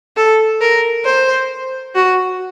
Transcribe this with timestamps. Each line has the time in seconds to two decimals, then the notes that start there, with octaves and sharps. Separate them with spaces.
0.17 A4
0.61 A#4
1.05 C5
1.95 F#4